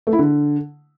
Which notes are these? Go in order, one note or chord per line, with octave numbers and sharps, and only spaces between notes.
A3
E4
D3